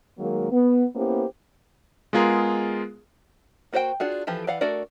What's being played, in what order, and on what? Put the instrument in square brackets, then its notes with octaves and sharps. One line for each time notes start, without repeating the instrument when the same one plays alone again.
[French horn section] D#3 F#3 G#3 A#3
B3
A#3 B3 C#4 E4 G4 C5
[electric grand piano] G#3 B3 F4 G#4 A#4
[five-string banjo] A#3 F#4 C5 D5 G5
D4 F4 F#4 G#4
E3 F3 G4 A4
E3 D5 F5 F#5
A3 D4 F#4 A#4 D5